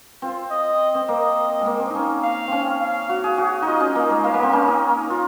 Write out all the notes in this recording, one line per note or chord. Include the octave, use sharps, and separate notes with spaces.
C4 F4
D#5
C4
A#3 D#5
G#3 A#3
C4
C#4 D#4
F5
C4 C#4
F5
F#4
G#4
F#4 F5
D#4 F4 D#5
C#4
A#3 D#5
G#3
A#3 F5
A#3
C4
C#4 G#5
D#4
F4